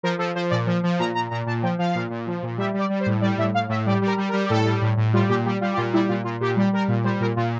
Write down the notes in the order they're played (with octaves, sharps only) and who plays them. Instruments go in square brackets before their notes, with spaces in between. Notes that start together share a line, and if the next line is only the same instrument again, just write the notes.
[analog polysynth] F3 A#4
F3 A4
F3 C5
A#2 D5
F3
F3
A#2 A#5
A#2 A#5
A#2 A#5
A#2 A5
F3 G5
F3 F5
A#2
A#2
F3
A#2
G3 E5
G3 D5
G3
C5
A2
G3 D5
A2 E5
A2 F5
A2 E5
G3 D5
G3
A#4
G3
A#4
G3
G4
A2 A4
G3
A2
A2
G3 F4
A#2 G4
G3 G4
G3 F4
G4
A#2 F4
G3 E4
A#2 F4
A#2 F4
A#2 G4
G3
G3 A#4
A#2
G3 C5
A#2 A#4
A#2 F4